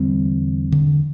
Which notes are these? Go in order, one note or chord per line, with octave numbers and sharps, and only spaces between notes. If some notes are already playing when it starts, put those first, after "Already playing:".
Already playing: E2 D3 G3 C4
D3